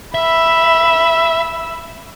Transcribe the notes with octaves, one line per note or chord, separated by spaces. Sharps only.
E5 B5 E6